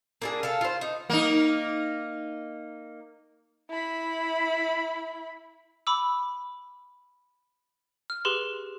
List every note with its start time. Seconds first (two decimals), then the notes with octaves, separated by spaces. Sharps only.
0.22 A#3 D4 G#4
0.43 A4 F5
0.61 F4 C5
0.81 D#4
1.10 A#3 D#4
3.70 E4 B5
5.87 B5 D6 E6
8.10 F6
8.25 G4 G#4 B4 C6